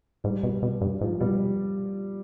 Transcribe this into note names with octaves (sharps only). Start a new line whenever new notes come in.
G#2 G3
B2
B2
G2
G#2 F3
B2 G3